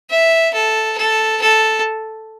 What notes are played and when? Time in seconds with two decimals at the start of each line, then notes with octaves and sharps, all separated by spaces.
0.10 E5
0.54 A4
0.97 A4
1.42 A4